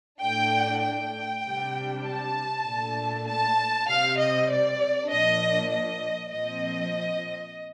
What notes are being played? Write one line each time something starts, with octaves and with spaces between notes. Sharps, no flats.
A2 A3 D4 G5
G5
C3 G3 D4
A5
A#2 A3 D4
A5
C3 G3 C4 F5
D#5
D5
A#2 F3 A#3 D4 D#5
D#5
A#2 F3 C4 D#5